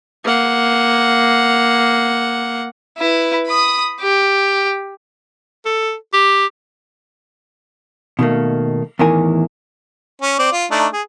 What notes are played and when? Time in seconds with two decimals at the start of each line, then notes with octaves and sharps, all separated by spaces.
0.24 A#3 F#5
2.98 E4 B4
3.47 B5 D#6
4.01 G4
5.65 A4
6.13 G4
8.19 B2 D#3 A3 A#3
8.99 E2 A2 D#3 E3 A#4 G#5
10.22 C#4
10.39 C4 D5
10.52 F4
10.71 A3 D4 D#4
10.93 G#4